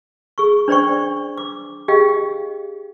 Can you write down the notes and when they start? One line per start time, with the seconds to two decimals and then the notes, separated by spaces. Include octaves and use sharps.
0.38 G#4 C#6
0.68 D4 C5 D5 G5 C#6
1.38 D6
1.88 G4 G#4 D#5 F5 G5